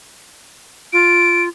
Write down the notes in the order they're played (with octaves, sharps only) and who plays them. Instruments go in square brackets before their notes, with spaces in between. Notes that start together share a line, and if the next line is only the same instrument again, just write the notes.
[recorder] F4 [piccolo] D7